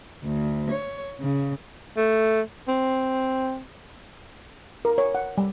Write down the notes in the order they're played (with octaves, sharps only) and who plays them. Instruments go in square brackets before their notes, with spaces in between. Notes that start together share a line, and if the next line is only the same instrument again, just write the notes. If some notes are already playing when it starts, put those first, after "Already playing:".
[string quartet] D2
C#5
C#3
[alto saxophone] A3
C4
[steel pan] A#4
C#5
F#5
G3